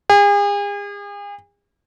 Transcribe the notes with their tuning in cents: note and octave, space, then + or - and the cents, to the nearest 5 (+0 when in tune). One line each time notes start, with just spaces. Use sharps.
G#4 -40